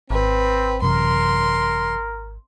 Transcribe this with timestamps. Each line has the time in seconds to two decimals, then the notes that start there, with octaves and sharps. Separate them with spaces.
0.10 G#1 C4 B4
0.82 F#2 C3 E3 A#4 C6